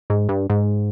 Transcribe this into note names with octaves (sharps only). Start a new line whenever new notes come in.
G#2
G2
G#2